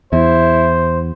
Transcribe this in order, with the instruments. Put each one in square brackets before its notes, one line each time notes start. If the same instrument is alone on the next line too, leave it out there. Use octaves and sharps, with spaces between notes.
[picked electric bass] E2 [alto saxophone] E4 [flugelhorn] C5